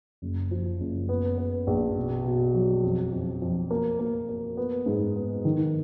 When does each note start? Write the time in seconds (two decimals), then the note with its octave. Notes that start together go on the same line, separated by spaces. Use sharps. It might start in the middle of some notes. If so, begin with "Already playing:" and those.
0.22 F#1
0.51 F3
0.80 F#1
1.09 B3
1.38 B3
1.67 A#1
1.96 B2
2.25 B2
2.54 F#3
2.83 F2
3.12 F2
3.42 F2
3.71 A#3
4.00 A#3
4.29 A#3
4.57 B3
4.86 G#2
5.16 B3
5.45 D#3